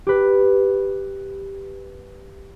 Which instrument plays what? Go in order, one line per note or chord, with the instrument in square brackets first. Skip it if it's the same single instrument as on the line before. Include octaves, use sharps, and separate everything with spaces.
[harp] G4 B4